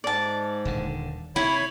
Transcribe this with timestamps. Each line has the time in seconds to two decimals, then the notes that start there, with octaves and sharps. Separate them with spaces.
0.04 G#2 D5 A5
0.65 D#1 D3
1.36 C3 E4 C#5 B5